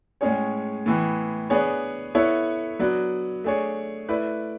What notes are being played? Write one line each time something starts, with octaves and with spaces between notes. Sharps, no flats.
A2 G#3 C#4 G#4 C#5
A2 E3 B3
B3 D4 G#4 C#5
B3 E4 A4 C#5
F#3 B3 D4
A3 D4 G#4 C#5
A3 E4 B4 D5